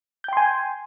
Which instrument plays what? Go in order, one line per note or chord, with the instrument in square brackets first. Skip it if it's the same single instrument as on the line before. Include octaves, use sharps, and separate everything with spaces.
[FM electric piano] G6
G5
C6
G#5